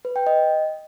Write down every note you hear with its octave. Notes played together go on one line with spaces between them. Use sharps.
B4
G5
D#5